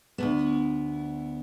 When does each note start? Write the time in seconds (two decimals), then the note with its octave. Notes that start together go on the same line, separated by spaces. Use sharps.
0.18 D2 G2 B3